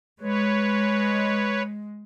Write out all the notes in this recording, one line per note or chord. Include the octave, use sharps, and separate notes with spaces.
G#3 B4 C#5